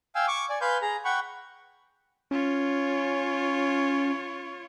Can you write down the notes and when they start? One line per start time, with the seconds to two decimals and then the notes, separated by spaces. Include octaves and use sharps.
0.15 F5 G5 G#5 E6
0.28 C#6 D6
0.50 D5 G#5
0.61 B4 F5 G#5 C6 G6
0.82 G#4 A#5
1.05 F#5 G5 B5 C#6
2.31 C#4 F4 C#5